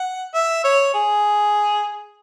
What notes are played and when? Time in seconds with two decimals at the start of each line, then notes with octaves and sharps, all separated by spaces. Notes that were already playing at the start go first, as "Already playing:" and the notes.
Already playing: F#5
0.34 E5
0.64 C#5
0.94 G#4